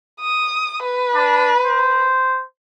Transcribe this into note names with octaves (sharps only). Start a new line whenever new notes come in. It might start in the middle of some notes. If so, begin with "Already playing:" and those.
D#6
B4
D4
C5